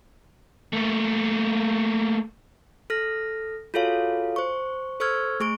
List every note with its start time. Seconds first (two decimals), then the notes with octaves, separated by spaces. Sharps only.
0.73 A3 A#3
2.90 A4 F6 A#6
3.74 F4 F#4 G#4 A4 C#5 F5
4.36 C5 C#6
5.00 A4 C5 C#6 E6 F6 G#6
5.40 A3 G#4 C#6 D7